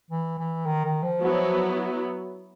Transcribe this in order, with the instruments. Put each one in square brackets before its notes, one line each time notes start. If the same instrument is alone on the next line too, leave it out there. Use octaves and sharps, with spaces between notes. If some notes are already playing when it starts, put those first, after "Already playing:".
[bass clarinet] E3
E3
D#3
D#3
F3
[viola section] F#3 B3 E4